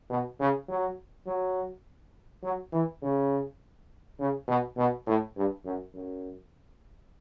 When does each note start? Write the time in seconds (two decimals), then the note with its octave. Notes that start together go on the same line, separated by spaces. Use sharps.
0.10 B2
0.40 C#3
0.68 F#3
1.27 F#3
2.43 F#3
2.72 E3
3.02 C#3
4.19 C#3
4.48 B2
4.77 B2
5.07 A2
5.36 G2
5.65 F#2
5.94 F#2